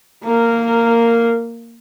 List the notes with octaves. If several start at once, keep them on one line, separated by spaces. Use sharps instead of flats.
A#3 A#4